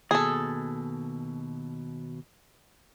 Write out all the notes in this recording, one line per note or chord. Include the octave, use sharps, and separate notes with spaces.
D#2 B2 G#4 A4